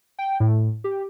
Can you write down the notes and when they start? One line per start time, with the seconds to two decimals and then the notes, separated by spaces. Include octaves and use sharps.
0.19 G5
0.40 A2
0.84 G4